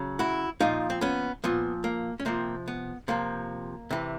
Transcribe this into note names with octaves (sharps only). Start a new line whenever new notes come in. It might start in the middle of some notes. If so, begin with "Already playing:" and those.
Already playing: C#3 F#3
E4 F#4
A#2 F3 D#4 F4
C4
B3 C#4
A#2 F3 B3
A#3
C#4
C3 F3 A#3 C4
B3
C3 F3 A#3
C3 E3